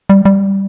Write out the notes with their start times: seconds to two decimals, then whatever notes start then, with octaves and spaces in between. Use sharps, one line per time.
0.10 G3
0.25 G3